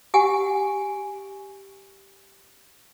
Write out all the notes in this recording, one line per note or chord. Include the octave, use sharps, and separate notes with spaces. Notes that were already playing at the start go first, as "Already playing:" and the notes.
G4 F#5 G#5